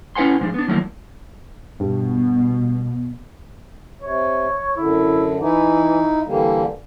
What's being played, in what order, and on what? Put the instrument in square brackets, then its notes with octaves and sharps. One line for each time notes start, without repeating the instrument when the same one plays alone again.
[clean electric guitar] C#4 E4 B4 F#5 G#5 C6
G#2 F3 G#3 D4
B3 D4
D#3 F3 F#3 A3 A#3 E4
[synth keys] G2 [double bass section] B2
[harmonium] C3 [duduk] C#5
[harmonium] F#2 D3 [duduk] E4
[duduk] E3 [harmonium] D#4 E4
[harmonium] D3 G3 A#3 [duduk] E3